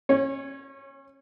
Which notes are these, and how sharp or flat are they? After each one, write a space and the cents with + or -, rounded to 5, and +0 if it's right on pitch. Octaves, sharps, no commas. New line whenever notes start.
C#4 -30 C#5 +0